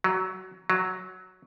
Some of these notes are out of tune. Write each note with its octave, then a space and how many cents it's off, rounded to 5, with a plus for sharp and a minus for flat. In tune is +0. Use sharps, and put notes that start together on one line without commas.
F#3 +15
F#3 +0